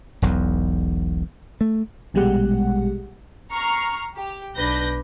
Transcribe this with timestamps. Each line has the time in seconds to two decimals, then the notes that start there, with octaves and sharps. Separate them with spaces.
0.22 E1 B1 E2
1.61 A3
2.14 A#1 B2 G3 G#3 G4 F#5
3.51 A#5 C#6 F6 C7
4.16 G4
4.54 B1 D4 B4 G6 A#6